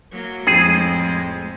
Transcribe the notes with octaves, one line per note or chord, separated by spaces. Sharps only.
F#3 A#3
F2 A2 G#3 G#4